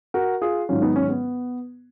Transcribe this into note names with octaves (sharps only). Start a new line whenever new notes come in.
F#4 A#4
F4 G#4
G#2 D#3 F#3 C#4 F4
B3 D#4
C#4
B3